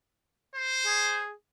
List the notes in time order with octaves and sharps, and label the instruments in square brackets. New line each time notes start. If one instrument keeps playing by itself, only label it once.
[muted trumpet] C5
[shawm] G#4